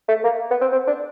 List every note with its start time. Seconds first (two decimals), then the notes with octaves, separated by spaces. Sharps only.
0.09 A3
0.24 A#3
0.51 B3
0.61 C4
0.72 C4
0.87 D4